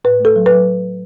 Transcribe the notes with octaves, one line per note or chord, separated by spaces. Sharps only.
A2 B4
A3 A4
F#3
F#3 B4